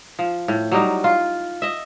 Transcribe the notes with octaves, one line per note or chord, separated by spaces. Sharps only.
F3
A2
F#3 G3 D#4
F4
D#5 E5